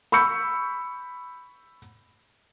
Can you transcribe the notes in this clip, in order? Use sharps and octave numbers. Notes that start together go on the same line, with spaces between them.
B5 C#6 E6 G6 C#7